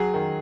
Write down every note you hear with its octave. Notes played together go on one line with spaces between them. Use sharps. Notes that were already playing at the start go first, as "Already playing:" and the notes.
Already playing: F#3 G#4
D#3